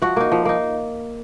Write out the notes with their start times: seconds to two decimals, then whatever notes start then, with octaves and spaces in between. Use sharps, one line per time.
0.02 F3 F#4 F#5
0.16 A#3 D#4
0.32 F3
0.45 A#3 D#4